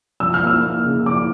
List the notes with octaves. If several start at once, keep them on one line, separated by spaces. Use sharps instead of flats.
F3 E6
F6
A#3
E6
A#3
C#3
F3 D6